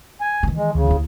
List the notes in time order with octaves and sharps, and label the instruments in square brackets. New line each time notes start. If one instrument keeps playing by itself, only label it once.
[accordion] G#5
[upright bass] D#3 E3
[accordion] G#3
[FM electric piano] D2 [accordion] C#3
[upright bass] D#2 E4